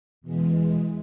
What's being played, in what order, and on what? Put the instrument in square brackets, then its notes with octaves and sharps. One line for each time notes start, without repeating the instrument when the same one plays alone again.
[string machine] E2 B2 E3 G#3